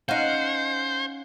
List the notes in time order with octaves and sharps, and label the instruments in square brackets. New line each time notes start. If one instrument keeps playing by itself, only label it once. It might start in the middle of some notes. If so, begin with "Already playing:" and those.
[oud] C#4 D#4 [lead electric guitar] C5 [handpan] F5 F#5